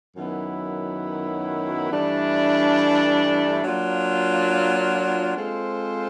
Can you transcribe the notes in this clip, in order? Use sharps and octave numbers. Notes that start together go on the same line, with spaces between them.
F#2 D#3 F#3 B3 E4
G2 E3 A3 D4
F#3 A#3 D4 F4
G#3 C4 F4 A4 C5